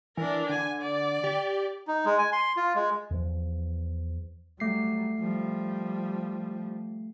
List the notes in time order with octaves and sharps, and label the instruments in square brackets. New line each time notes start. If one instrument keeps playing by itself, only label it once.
[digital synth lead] E3 [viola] D4 A#4
[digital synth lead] D3 [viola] G#5
[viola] D5
[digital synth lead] G4
[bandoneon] D#4
G#3
G#5
C6
F4
G#3
[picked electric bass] E2 F3
[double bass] F#3 G3 [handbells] A3 C7
[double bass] F3 G3